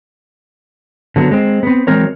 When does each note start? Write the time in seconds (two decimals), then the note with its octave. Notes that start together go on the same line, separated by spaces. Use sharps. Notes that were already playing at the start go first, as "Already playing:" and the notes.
1.16 D3 F#3 B3
1.31 G#3 C4
1.63 B3 C4
1.87 E3 F#3 G#3 C4 A#4 C#5